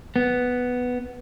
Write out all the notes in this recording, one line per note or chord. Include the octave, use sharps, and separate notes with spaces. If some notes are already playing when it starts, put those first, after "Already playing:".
B3